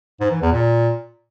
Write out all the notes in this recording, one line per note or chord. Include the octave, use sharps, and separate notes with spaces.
G#2
E3
E2
A#2